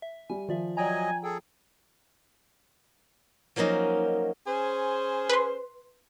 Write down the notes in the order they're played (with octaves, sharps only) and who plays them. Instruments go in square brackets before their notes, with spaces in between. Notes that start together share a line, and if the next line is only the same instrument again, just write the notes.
[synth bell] E5
[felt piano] G3 [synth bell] G#5
[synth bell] D#3 D5 E5 [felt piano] F3
[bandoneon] F#3 D#5 [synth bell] D5 G5 A#5 [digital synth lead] G#5
[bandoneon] G#4 A4 [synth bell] G5
[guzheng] F3 F#3 A#3 C#4 D#4
[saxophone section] C#4 G#4 C5
[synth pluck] B4 C6